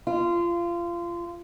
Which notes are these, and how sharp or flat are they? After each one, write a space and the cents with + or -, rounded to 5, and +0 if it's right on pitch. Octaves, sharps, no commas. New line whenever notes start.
F4 -25